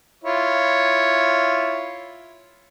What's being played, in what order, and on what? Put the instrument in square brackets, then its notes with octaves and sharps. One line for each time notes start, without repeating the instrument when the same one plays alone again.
[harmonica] E4 F4 C#5